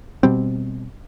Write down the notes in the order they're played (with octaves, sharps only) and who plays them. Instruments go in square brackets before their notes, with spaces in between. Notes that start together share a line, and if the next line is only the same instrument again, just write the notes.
[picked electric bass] B2 G3 C4